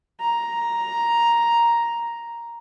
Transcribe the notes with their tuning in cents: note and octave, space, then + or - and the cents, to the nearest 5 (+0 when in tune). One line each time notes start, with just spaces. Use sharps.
A#5 +5